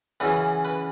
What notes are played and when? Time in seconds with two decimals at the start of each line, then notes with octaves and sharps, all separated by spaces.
0.20 F#2 C#3 E3 B4
0.65 B4